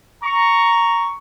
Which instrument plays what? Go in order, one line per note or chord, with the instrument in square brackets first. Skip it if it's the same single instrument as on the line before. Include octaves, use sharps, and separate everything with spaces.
[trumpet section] A#5 C#6